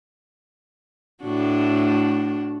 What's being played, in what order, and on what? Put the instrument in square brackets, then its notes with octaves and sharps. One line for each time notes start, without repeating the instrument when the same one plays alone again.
[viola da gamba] A2 D4 F#4